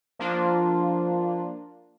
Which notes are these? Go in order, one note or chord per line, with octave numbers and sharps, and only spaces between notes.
F3 A#3 D4 F4